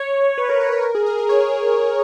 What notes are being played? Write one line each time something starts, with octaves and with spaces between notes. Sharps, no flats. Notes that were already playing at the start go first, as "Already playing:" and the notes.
Already playing: C#5
B4
A#4
B4
C#5
A#4
G#4
A#4
A#4
C#5